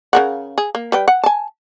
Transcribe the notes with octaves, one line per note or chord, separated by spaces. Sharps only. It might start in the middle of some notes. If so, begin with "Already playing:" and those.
C#3 A#4 F#5
G#4
A#3
G3 B4 G5
F#5
G#5 A5